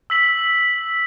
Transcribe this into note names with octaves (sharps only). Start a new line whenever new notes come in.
E6 B6 F#7